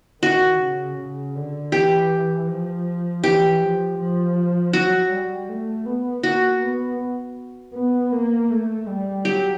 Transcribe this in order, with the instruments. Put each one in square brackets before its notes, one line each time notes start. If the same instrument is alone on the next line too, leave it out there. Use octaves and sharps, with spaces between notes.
[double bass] D#3 [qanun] F#4
[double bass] C#3
C#3
D3
[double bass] E3 [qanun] G4
[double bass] F3
[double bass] E3 [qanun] G4
[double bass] F3
F3
[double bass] F#3 [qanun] F#4
[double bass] G3
A3
B3
[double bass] A#3 [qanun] F#4
[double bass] B3
B3
A#3
A3
G3
[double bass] F#3 [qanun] G4